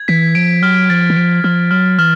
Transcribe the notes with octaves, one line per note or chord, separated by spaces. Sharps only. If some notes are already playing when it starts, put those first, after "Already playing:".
Already playing: G#6
E3 B6
F3 D7
F#3 F6
F3 A6
E3
F3 D7
F3 F6
F#3 F6
E3 F6